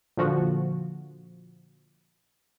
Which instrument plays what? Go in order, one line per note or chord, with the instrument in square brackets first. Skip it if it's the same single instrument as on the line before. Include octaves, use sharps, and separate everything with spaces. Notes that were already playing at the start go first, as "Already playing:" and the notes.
[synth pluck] A#2 D3 F3 F#4